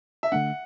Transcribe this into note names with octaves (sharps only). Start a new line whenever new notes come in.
E5
D3 A3 D4 F#5